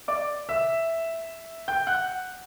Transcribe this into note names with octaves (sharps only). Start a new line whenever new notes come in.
D5 D6
E5 E6
G5 G6
F#5 F#6